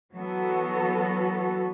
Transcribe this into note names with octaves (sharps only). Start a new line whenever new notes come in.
E3 F#3 B3 F#4 A4